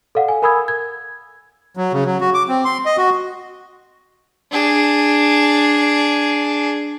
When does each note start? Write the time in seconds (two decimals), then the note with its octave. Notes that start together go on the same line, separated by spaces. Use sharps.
0.15 A4 D5 F5 F#5
0.28 G#5
0.42 A#4 G#5 B5 D#6 E6 G#6
0.68 G#6
1.77 F#3
1.93 C#3
2.06 F#3
2.21 F#4
2.34 D6
2.48 C4
2.65 C6
2.86 D#5
2.97 F#4
4.51 D4 G#4